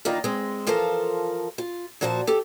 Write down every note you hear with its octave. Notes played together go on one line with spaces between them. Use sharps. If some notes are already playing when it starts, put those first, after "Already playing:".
D#3 E3 A#3 D4 D#4 F4
G#3 C4
E3 F3 F4 A4 A#4 C5
F4
A#2 F3 F#4 C5 A5
G4 A4